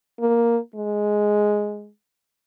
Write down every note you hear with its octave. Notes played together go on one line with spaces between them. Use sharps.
A#3
G#3